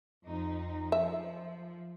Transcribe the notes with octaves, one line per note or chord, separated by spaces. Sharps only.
F2 D#4
F3 E5